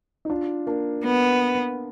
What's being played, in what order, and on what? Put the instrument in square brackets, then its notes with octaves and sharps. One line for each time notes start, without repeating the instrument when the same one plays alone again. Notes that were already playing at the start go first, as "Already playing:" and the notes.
[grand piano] D#4
D4 F4
A#3 D4
[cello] B3